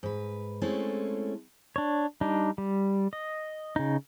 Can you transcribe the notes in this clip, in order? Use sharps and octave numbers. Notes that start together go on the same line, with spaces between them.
G#2 B4
G#3 A3 C4 C#4 E4 A4
D4 C#5
G3 D4 D#4
G3
D#5
C#3 D#4